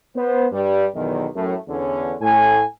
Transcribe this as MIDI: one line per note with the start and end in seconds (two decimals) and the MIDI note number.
0.16 0.46 59
0.16 0.46 72
0.52 0.85 43
0.52 0.85 55
0.94 1.27 35
0.94 1.27 40
0.94 1.27 51
1.35 1.55 42
1.35 1.55 45
1.35 1.55 57
1.67 2.15 40
1.67 2.15 50
1.67 2.15 52
1.67 2.15 61
2.20 2.63 45
2.20 2.63 80